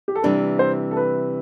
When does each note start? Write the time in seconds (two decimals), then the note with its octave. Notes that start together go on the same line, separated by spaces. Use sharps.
0.08 G4
0.15 A4
0.22 C3 E3 G3 D4 B4
0.59 C5
0.91 A4
0.97 B4